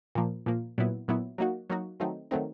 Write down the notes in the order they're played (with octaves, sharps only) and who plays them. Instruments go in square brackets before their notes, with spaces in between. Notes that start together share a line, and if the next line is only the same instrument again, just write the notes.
[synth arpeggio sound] A#2 F3 A#3
A#2 F3 A#3
A#2 F#3 B3 E4
A#2 F#3 B3 E4
F#3 A#3 D#4 F#4
F#3 A#3 D#4 F#4
D#3 F#3 A3 C4 D#4
D#3 F#3 A3 C4 D#4